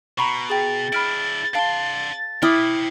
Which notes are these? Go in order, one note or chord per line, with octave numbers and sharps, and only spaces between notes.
B2 A#5 B5 C#6
G#4 G5 A6
D4 E4 B5 F6 D7
D4 F5 A5 C6
E4 E5 G5 D6 D#6 F6